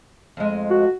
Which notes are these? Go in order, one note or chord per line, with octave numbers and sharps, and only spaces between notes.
F2 G#3
F#4